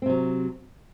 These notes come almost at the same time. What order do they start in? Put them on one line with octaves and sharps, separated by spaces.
C4 C3 F#3